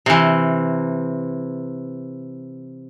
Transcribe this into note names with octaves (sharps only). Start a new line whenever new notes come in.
C3 E3